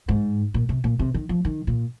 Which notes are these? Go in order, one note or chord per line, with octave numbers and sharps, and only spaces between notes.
G#2
A#2
C3
A#2
C3
D#3
F3
D#3
A#2